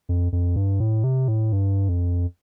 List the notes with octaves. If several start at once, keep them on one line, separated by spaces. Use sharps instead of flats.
F2
F2
G2
A2
C3
A2
G2
F2